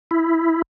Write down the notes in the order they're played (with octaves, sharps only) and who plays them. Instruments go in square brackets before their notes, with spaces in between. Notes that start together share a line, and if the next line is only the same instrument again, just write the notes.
[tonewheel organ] E4